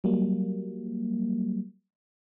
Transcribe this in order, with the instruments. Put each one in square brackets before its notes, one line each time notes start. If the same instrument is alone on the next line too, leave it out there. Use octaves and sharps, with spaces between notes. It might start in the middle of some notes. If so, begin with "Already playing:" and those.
[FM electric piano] F#3 G3 A#3